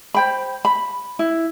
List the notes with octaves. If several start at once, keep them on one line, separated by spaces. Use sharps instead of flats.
C5 G5 B5
B5
E4